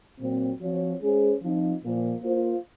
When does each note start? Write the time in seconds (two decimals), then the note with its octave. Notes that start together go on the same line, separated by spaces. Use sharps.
0.19 A#2 F#3 C4
0.60 F3 C4 F#4 C#5
1.00 G#3 C#4 G#4 C5
1.42 F3 C4 D#4
1.82 A#2 F3 A#3
2.22 A#3 F4 C5